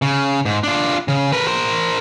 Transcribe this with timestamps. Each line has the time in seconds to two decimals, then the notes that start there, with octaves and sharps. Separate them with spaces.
0.02 C#3
0.45 G#2
0.63 D4 F4
1.08 C#3
1.32 A#4 B4
1.47 A#4 C5